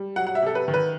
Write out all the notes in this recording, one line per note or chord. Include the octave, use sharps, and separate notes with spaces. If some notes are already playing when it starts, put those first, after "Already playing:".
Already playing: G3
F#3 F#5
F#5
E5
C3 A4
B4
D#3
B4